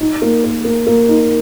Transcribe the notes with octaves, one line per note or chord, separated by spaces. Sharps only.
D#4
A#3
A#4
A#3
A#3
D#4